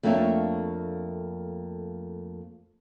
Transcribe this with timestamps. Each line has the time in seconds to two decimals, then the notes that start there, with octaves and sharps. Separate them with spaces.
0.03 F2 A3 A#3 D4 C#5 E5